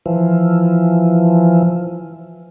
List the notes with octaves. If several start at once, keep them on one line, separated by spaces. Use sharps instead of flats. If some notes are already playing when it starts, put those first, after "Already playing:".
E3 F3